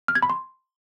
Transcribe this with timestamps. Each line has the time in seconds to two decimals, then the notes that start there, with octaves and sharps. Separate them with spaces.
0.08 F6
0.15 G#6
0.23 B5
0.30 C6